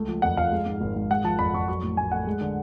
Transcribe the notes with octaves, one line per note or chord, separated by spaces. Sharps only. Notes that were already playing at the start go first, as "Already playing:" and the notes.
Already playing: C#2 A3
F3
F2 F#5
F2 F5
G#3
G#2
G#1
G#1
G#3 F#5
F3 A5
F2 B5
F2 C#6
F#3 C#6
A2
A1 G#5
A3 F#5
G#3
D3